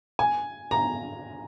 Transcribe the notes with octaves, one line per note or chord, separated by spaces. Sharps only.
G#5
A#5